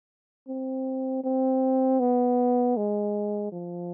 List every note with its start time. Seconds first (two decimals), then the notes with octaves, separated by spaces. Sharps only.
0.48 C4
1.24 C4
2.00 B3
2.77 G#3
3.52 F3